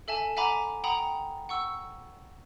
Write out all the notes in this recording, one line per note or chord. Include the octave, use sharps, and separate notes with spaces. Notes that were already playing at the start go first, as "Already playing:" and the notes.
A4 E5 G#5 A5
E5 F#5 G#5 A#5 B5 D6
F#5 G5 A#5 B5 D#6
F#5 C#6 E6